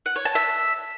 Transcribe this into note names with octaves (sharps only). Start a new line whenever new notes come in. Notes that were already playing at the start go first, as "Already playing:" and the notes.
F#5
C#5
A5
E5